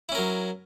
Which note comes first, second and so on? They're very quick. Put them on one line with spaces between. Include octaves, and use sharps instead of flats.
E4 C#4 A#4 F#3